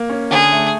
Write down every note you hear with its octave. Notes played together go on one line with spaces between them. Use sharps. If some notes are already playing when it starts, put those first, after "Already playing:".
Already playing: A#3
C#4
D3 G#4
A3